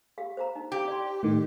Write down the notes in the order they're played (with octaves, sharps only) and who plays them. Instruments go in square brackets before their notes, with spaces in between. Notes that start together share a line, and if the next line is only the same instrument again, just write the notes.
[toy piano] G4 F5
C5 F5 A#5
D#4
[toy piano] E4 F5 [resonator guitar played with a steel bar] G4
[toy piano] D5 C6
[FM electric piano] A2 D#3